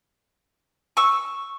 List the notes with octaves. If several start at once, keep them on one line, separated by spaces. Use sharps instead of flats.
C#6 E6